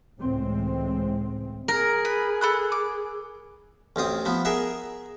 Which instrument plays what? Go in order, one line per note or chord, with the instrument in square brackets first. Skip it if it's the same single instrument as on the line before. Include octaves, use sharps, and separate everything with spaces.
[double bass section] C#2 A2 E3 G#3 C4
[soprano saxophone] G#4 [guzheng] A#4
[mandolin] B4
A4 B5 F#6
D6
[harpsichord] A1 D2 C4 D#6
F3 B3
G#4 A#4 E5 F#5